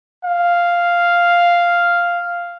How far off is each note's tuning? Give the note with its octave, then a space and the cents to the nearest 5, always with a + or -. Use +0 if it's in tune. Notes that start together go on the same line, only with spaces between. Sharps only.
F5 -5